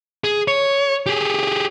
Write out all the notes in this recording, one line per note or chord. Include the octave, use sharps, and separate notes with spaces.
G#4
C#5
G4 G#4